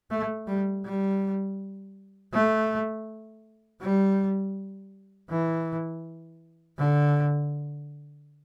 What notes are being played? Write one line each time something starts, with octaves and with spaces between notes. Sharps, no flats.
A3
G3
G3
A3
G3
E3
D3